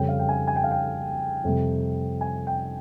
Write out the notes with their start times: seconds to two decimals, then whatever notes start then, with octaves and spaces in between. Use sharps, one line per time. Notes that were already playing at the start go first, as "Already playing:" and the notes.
Already playing: F2 C#3 G3 G5
0.08 F5
0.19 G5
0.29 G#5
0.48 G#5
0.56 G5
0.64 F5
0.71 G5
1.44 F2 C3 G3
2.21 G#5
2.47 G5